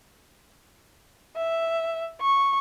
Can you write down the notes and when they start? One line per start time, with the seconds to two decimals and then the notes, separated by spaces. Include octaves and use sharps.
1.36 E5
2.21 C#6